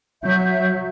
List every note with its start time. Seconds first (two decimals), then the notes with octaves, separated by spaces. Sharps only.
0.22 F#3 E5 G6